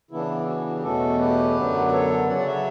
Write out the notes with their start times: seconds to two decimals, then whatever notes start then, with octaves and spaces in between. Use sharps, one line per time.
0.11 C#3 E3 B3 D4 E4
0.47 F#4
0.67 F#4
0.75 G4
0.83 E2 B2 A3 C#4 F#4 A4
1.19 G4 B4
1.56 F#2 D3 F#3 B3
1.87 B4
1.92 A4 C#5
2.28 C#3 F#3 C#4 D5 F#5
2.38 D5
2.46 C#5 E5